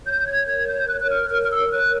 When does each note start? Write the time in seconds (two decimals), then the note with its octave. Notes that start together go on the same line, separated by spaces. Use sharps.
0.06 C#5 G6
0.26 G#6
0.47 A#4 G#6
0.68 G6
0.88 C#5 F#6
1.00 F#6
1.09 F6
1.29 A#4 F6
1.43 F6
1.50 E6
1.70 C#5 F#6